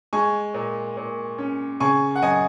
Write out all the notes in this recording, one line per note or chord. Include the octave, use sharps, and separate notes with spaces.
G#3 G#5 C#6
A#2
A#2
C#4
C#3 G#5 C#6
F#5
F#2 D#5 G#5